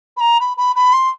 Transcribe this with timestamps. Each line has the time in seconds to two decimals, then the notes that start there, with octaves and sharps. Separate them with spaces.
0.17 B5
0.20 A#5
0.40 B5
0.57 B5
0.75 B5
0.93 C6